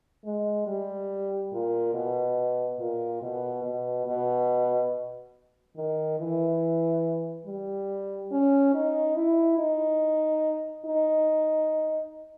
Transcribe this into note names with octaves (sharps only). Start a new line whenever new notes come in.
G#3
G3
A#2
B2
A#2
B2
B2
B2
D#3
E3
G3
C#4
D#4
E4
D#4
D#4